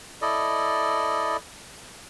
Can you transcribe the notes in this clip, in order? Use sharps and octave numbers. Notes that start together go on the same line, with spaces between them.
E4 A4 D5 D#5